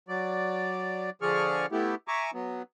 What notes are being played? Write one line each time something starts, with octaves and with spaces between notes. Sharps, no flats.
F#3 D5
D3 F3 G#4 D5 C#6 F6
A3 B3 E4 G4
E5 G#5 A#5 C#6 D6
F#3 B3